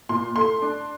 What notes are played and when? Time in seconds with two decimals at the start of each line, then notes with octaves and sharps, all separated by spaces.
0.09 A#2 C6
0.36 A3 C6
0.62 D4